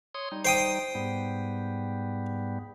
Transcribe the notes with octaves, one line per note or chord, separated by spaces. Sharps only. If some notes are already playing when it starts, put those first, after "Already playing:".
C#5 C6 D#6
G3 D#4
C5 G5 D#6
G#2 G3 B3